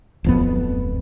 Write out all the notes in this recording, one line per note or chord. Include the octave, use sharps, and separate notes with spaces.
D1 F2 B3